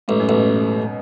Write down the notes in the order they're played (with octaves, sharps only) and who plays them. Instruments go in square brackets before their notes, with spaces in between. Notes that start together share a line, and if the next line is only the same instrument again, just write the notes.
[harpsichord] A1 [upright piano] G#2
[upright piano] F#2
[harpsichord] A1 [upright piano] B2